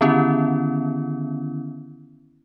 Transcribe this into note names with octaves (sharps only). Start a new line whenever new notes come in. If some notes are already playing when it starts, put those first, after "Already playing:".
D3 D#3 B3 C#4 E4